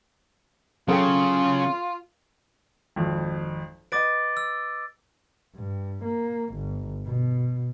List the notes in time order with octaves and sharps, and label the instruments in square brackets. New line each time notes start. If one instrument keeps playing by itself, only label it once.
[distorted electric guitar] C#3 [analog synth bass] F#3 [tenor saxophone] F4 [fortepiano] G#4 A4 G5
[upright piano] G#1 F2
[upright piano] B4 D#5 [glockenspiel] D6 A6 D7
[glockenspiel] E6
[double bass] G2
A#3
G1
B2